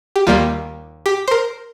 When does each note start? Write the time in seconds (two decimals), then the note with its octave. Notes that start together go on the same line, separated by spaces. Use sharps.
0.16 G4
0.27 D#2 D#3 G3 A#3 F4
1.06 G4
1.28 C5
1.31 A#4